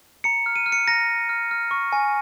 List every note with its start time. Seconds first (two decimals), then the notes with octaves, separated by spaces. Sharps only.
0.24 A#5 C#7
0.46 F6
0.56 D#7
0.66 F6
0.72 C#7
0.87 A#5 A#6
1.08 A#5
1.29 F6
1.51 F6
1.71 C#6
1.92 G#5